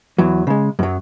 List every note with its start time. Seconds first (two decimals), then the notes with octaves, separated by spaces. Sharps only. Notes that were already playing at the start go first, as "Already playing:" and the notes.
0.18 E2 E3 F#3
0.47 C#3 G#3
0.79 F#2 F#3